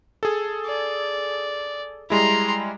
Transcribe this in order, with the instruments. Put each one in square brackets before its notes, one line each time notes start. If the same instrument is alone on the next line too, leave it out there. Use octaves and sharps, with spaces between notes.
[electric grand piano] G#4 A4
[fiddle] D5
[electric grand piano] G3 G#3 E4 [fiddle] A#5 C6